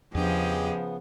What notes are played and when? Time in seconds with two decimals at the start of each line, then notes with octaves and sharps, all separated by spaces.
0.15 E2 C#3 F3 B3 D4 G4 G#4 D#5